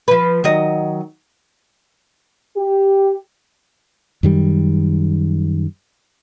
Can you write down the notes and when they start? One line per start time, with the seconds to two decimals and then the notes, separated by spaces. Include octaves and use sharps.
0.08 F3 B4
0.44 D#3 F#3 D#5
2.56 G4
4.23 F#2 D#3 G3